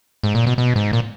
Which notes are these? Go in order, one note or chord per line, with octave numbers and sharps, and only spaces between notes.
G#2
A#2
B2
B2
G#2
A#2